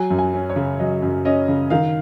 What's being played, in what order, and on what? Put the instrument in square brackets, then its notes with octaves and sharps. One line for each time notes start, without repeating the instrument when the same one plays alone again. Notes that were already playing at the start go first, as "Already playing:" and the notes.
Already playing: [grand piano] F#3 G#5
F#2
G#5
C#4
C#5
C#3
F#3 D#5
F#2
C#4 D#5
C#3
D#3 F5